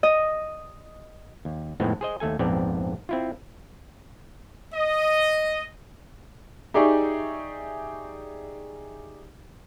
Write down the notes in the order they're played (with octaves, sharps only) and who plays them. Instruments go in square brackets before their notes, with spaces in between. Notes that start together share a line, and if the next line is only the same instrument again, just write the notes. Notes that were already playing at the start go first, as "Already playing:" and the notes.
[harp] D#5
[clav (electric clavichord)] D#2
F2 A2 D#3 G#3 B3 C4
G#4 C5 D#5
D#2 A3 A4 G#5
A#1 F2 G#2 B3 C4 D5
C4 E4 F4
[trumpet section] D#5
[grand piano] D#4 G4 G#4 D5 E5 C#6